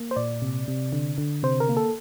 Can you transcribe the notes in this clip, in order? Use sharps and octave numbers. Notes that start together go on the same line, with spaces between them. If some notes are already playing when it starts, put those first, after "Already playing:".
Already playing: A#3
C5
A#2 D5
C3
C3
D3
D3
C3 C5
A#4
A#3
A4